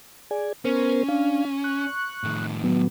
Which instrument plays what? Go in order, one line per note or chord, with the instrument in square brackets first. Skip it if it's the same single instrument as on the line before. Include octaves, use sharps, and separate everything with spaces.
[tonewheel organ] G#4 D5 G#5
[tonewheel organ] B3 A#4 C5 [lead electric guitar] C#4
[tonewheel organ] D4 F5
C#6 F#6
[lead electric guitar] A2 D#3
[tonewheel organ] F#3 B3